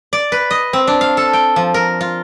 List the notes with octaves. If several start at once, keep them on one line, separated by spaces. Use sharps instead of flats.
D5
B4
D#5
C4
D4
F5
A4
G5
F3
A#4
F4